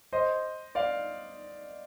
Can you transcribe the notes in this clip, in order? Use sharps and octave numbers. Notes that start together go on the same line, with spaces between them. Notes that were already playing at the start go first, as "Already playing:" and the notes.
C5 D#5
D5 F5